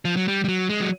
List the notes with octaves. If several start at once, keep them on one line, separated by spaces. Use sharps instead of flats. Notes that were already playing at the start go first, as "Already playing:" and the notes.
F3
F#3
G3
G3
F#3
G#3
F#3